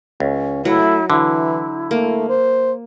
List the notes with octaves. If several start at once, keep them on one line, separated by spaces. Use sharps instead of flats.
C#2 C#4
F#3 A3 E4
D3 E3 E4
A3 A#3
C5